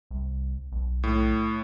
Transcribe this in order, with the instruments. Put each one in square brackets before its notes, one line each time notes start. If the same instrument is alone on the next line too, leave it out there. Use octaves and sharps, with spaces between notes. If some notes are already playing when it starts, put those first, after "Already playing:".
[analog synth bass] C2
B1
[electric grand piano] A2